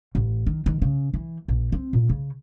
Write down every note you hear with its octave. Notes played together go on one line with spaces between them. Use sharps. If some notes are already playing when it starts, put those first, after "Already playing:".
A1
D#3
D#3
C#3
E3
A#1
C4
A#2
C#3